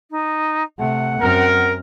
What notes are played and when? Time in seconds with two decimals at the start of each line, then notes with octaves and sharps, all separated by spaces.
0.10 D#4
0.79 C3 A3 F#5
1.21 F#2 C4 A#4